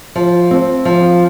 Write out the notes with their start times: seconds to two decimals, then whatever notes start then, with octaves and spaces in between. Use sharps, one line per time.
0.15 F3
0.51 C4
0.85 F3